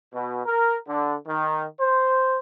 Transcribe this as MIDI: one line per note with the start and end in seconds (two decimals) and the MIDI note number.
0.14 0.42 47
0.46 0.77 70
0.87 1.15 50
1.27 1.64 51
1.81 2.38 72